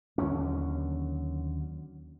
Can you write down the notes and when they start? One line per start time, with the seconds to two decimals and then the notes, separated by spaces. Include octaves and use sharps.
0.18 D#2 D3 F#3 C#4